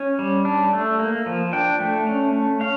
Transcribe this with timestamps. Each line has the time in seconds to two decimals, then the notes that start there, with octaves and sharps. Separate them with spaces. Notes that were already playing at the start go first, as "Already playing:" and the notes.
Already playing: C#4
0.19 G3
0.45 D4
0.73 A3
0.99 A#3
1.26 F3
1.53 D4 G5
1.80 A3
2.07 C#4
2.33 A3
2.60 C#4 F5